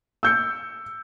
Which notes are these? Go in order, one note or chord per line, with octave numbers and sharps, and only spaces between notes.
E6 G6 C#7